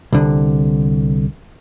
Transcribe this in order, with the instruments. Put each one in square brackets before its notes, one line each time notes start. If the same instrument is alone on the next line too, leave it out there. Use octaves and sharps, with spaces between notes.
[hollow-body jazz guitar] C2 D3